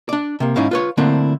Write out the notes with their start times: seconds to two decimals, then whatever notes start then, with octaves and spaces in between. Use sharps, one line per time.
0.09 D4 D5
0.40 C3 A#3
0.56 G#2 C#4 D#4 E4 F5
0.71 F4 B4 C#5
0.97 D3 A3 A#3 C4 D4 E4